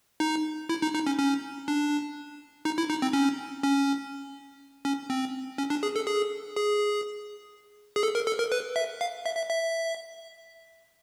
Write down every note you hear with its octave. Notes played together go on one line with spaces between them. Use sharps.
D#4
E4
D#4
D#4
C#4
C#4
D4
D#4
E4
D#4
C4
C#4
C#4
C#4
C4
C#4
D4
G#4
A4
G#4
G#4
G#4
A4
A#4
A4
A#4
B4
E5
F5
E5
E5
E5